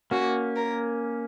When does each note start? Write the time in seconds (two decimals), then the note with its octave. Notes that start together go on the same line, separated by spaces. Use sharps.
0.11 A#3 C#4 F#4
0.56 A#4